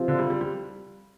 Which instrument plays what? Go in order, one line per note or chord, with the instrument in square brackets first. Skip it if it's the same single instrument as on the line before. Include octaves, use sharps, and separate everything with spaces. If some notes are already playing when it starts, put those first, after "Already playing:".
Already playing: [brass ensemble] C3 F3 C4 F4
[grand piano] D3
G3
G3
G3